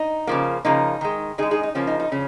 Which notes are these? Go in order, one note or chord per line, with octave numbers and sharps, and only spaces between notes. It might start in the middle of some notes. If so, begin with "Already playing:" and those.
Already playing: D#4
C#3 F3 A#3
C#3 F3 A#3 D#4
D#3 G#3
D#3 G#3 D#4 G#4
D#4 G#4
D#4
C#3 F3 A#3 C#4
D#4
D#4
C#3 F3 C#4